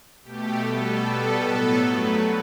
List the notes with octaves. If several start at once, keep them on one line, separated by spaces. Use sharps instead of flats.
B2 A3 G4
B2 G3 B3 A4
B2 G3 B3 A4
A2 F#3 B3 A4
G2 F#3 A3 B4